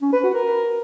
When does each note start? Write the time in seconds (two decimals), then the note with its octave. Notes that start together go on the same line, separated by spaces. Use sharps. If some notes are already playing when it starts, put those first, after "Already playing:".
0.02 C#4
0.13 B4
0.23 F#4
0.34 A#4